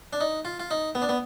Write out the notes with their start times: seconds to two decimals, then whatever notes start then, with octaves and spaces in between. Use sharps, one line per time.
0.13 D4
0.21 D#4
0.45 F4
0.60 F4
0.71 D#4
0.95 B3
1.02 D4
1.09 B3